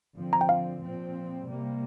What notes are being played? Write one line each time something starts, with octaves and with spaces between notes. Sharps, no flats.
D3 F3 C4
A#5
G5
F5
A#2 F3 C4
C3 G3 A#3